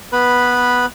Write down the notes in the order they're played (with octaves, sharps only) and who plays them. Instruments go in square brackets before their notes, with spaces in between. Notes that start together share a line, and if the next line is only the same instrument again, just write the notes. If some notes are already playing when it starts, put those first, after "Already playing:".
[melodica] B3 B4 B5